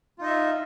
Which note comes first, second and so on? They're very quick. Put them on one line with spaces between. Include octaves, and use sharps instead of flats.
F4 D#4 D#5 E5